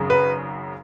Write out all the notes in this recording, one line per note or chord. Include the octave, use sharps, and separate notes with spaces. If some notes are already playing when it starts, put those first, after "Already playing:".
Already playing: G#1 F#2 C#3
B4